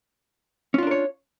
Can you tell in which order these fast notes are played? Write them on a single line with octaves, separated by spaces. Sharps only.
C#4 F4 D4 A#4 C#5